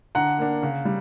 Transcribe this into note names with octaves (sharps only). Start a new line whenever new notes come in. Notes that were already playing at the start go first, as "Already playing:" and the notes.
D3 F#5 A#5
A#3 D4
C#3
G3